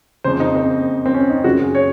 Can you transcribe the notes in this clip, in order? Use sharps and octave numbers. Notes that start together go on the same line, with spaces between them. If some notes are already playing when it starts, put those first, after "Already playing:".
F2 C#3 C5
D#4
C4
C4
C#4
D#4
F#2 C#3 F#4
G#4
C#5